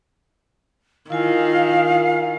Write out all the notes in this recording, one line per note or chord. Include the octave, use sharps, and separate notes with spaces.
D#3 E4 F4 F5 G#5